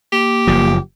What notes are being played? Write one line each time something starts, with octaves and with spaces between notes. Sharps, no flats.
A#3 G4
F#1 F3